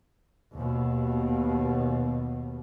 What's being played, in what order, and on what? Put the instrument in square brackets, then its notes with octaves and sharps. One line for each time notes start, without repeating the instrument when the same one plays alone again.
[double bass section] D#2 B2